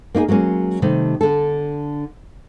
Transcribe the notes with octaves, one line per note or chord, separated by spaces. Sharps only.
A#3 D#4 F4 G#4
F#3 G#3 A#3 C#4
C3 D#3 G3 A3
D3 A4